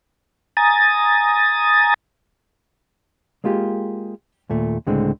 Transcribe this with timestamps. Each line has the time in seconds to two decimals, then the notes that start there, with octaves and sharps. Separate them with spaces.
0.57 G#5 A#5 D#6 A6
3.44 G#3 A#3 F4 G4 G#4
4.50 D#2 A#2 A3
4.87 C#2 A2 D3 G#3 C4